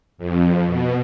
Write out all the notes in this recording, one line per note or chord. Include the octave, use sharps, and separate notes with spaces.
F2
B2